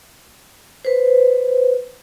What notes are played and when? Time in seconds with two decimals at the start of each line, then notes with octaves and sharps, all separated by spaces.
0.85 B4 C5